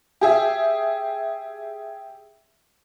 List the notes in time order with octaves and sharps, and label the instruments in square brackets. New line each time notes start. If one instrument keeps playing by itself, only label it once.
[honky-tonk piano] G4 G#4 E5